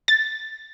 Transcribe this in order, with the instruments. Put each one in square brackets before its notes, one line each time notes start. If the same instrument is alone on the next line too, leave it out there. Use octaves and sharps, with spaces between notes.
[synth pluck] A6